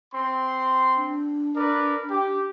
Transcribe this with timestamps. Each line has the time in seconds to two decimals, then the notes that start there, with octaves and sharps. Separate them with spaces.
0.14 C4 C6
0.97 D4
1.56 A#4 B4 D5
2.10 G4